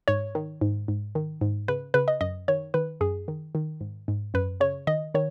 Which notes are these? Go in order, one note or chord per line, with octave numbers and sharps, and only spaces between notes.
G#2 C#5
D#3
G#2
G#2
D#3
G#2
C#3 B4
C#3 B4
D#5
F#2 D#5
D#3 C#5
D#3 B4
F#2 G#4
D#3
D#3
G#2
G#2
F#2 B4
C#3 C#5
D#3 D#5
D#3 C#5